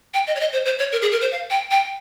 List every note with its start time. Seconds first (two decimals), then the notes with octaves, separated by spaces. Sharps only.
0.14 G5
0.27 D#5
0.36 C#5
0.40 D#5
0.52 C5
0.65 C5
0.79 C#5
0.92 A#4
1.02 G#4
1.12 A#4
1.21 C5
1.32 F5
1.50 G5
1.71 G5